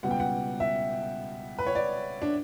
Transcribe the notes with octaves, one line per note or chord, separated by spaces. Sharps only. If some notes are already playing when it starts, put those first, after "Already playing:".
C#2 B2 G3 B3 F#5
G5
F#5
E5
B4
C#5
D5
D4